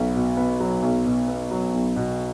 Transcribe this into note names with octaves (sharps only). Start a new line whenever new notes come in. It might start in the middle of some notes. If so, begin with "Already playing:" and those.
Already playing: B1 F#3 B3
B2
B3
F#3
B1
B2
B3
F#3
B1
B2